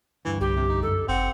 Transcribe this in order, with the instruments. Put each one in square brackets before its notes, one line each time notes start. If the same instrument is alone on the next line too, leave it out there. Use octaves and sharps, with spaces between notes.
[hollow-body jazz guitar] D2 G2 [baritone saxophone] E3
[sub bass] C2 [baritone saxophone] G3 [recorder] G4
[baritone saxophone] C3
D#4
[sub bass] F#2 [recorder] A4
[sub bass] G1 [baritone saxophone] C4 [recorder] F#5